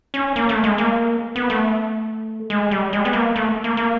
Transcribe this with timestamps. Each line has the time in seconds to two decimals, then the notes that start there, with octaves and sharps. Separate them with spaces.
0.14 C#4
0.36 A#3
0.49 A3
0.64 G#3
0.78 A#3
1.36 B3
1.50 A3
2.50 G#3
2.71 G3
2.93 G#3
3.05 B3
3.13 A#3
3.36 A3
3.64 A#3
3.77 A#3